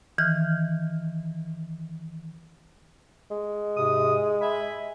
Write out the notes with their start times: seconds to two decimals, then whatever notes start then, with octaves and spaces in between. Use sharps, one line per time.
0.18 D#3 E3 F6
3.31 G#3
3.77 G#2 C3 D#6
4.41 E5 G#5 B5